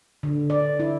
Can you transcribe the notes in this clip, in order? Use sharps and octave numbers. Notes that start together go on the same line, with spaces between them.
D3
D5
E4